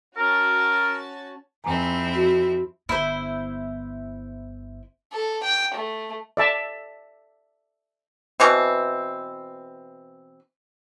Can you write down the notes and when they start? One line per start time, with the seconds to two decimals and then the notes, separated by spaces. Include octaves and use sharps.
0.17 C#4 F#4 A#4 A5
1.64 F2 C4 E4 G#5 A#5
2.15 F#4
2.89 G1 B3 E4 C5
5.12 A4
5.44 G5
5.74 A3
6.37 D5 E5 A5
8.40 B2 E3 C4